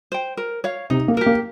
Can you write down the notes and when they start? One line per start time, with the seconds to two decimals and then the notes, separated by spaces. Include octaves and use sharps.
0.12 C5 G5
0.37 A#4
0.64 C#5 F5
0.90 C3 D#4
1.08 A#3
1.17 G4 A#4
1.26 A#3